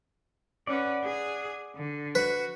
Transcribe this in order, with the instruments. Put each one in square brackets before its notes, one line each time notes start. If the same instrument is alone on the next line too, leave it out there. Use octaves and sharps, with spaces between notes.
[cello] C#4 B4 [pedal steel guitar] D5 F#5
[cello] G#4
D3
[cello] F#4 [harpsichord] B4